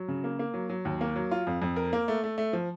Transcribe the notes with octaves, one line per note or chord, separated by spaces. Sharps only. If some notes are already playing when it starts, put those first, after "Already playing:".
Already playing: F#3
C#3
A#3
A#3
F#3
F#3
D#2
A#3
F#3
F4
F2
F2
A#4
A#3
A3
A3
A3
F3